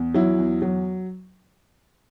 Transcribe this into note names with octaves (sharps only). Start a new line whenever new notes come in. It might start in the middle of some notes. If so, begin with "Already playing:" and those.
Already playing: E2
F#3 E4
E2
F#3